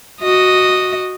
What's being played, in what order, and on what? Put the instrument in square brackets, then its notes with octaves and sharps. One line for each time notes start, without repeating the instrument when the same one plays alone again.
[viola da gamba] F#4 D#5